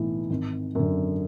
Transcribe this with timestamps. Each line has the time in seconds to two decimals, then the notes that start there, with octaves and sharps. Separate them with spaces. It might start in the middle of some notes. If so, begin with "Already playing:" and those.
Already playing: B1 A2 E3
0.30 G#1
0.75 F#2 D3